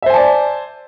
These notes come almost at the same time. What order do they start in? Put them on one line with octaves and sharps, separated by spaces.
E5 C5 G#5 A5 D5